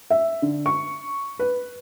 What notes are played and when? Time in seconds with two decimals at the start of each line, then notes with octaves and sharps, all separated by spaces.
0.10 E5
0.42 D3
0.66 C#6
1.39 B4